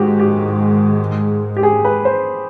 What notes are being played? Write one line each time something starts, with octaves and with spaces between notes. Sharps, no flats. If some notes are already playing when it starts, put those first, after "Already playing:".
Already playing: G#2 D#3 G#3 F#4 G4
G4
G4
G#4
B4
C5